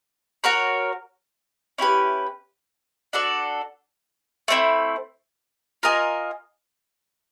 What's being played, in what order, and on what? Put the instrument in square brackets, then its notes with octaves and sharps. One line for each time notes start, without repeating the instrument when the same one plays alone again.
[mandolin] F#4 A#4 C#5
C#4 E4 G4 B4
D4 F#4 A4 D5
A3 C4 E4
F4 A#4 D#5 G#5